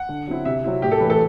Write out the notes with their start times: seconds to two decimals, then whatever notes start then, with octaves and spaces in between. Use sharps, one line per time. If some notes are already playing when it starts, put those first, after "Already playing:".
Already playing: F#5
0.09 D3
0.27 F#3 C4 E4
0.45 C3 E5
0.64 F#3 C4 E4
0.82 A2 G4
0.91 A4
1.00 E3 A3 B4
1.10 A4